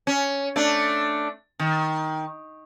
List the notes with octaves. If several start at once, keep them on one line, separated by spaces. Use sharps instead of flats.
C#4
A3 D4
D#3